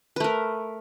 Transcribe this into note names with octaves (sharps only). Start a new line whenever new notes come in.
A3 A#4 B4